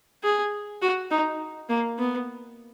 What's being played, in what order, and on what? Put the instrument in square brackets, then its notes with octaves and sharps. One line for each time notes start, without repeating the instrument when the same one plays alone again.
[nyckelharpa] G#4
F#4
D#4
A#3
B3